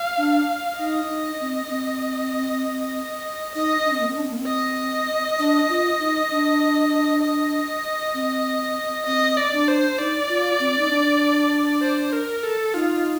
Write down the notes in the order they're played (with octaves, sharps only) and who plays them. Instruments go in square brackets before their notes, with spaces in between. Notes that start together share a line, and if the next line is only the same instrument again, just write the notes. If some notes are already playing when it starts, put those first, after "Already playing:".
Already playing: [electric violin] F5
[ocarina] D4
[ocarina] D#4 [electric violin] D#5
[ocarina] D#4
C4
D4
C4
[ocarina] D#4 [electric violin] D#5
[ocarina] D4
C4
A#3
C4
D4
C4
A#3
C4
[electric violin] D#5
[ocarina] D4
F4
D#4
D4
[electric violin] D#5
[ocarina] C4
[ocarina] C4 [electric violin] D#5
[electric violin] D5
[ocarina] D4
[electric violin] C5
[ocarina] D#4 [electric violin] D5
[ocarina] F4
C4
D#4
D4
[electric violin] C5
A#4
A4
[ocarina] D#4 [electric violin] F4